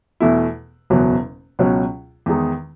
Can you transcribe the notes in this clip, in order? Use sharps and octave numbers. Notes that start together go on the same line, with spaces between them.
E2 B2 A3 E4
F#1 E2 B2 F#3
C#2 B2 F#3 C#4
E2 D#3 G#3 D#4